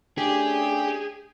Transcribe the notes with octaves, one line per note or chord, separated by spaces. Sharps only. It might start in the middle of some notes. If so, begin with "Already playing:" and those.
A3 C#4 D4 G4 G#4 G#5